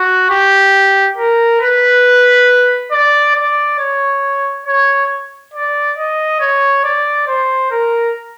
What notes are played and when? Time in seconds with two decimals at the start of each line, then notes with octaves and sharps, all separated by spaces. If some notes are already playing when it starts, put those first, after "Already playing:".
Already playing: F#4
0.31 G4
1.17 A#4
1.61 B4
2.92 D5
3.36 D5
3.79 C#5
4.67 C#5
5.54 D5
5.98 D#5
6.41 C#5
6.84 D5
7.28 C5
7.71 A#4